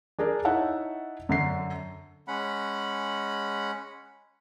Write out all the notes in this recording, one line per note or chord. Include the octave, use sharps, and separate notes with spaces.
D4 G#4 A#4 D5
D#4 E4 C#5 E5 F#5 A5
F#2 D3 C7
G#3 C#4 F#5 B5